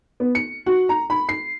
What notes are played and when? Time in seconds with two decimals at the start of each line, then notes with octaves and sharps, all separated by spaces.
0.20 B3
0.35 C#7
0.66 F#4
0.89 A#5
1.10 B5
1.29 C7